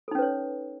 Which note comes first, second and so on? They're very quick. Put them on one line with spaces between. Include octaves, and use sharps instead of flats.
A4 D#4 C#4 B4 C#5